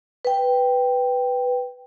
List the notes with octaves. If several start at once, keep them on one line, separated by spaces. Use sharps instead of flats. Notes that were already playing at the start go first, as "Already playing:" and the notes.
B4 G5